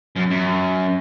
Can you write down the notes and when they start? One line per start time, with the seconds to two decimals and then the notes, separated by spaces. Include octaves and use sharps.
0.16 F#2
0.31 F#2